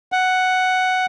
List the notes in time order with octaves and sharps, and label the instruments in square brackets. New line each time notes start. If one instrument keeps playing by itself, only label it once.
[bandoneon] F#5